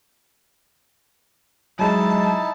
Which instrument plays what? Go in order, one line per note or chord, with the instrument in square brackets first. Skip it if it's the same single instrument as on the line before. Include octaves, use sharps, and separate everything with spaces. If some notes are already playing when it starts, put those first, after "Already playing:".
[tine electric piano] F#3 G#3 [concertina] D#4 E4 [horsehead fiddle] A5